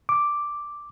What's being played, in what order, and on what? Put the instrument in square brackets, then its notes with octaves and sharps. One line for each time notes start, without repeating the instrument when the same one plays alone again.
[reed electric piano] D6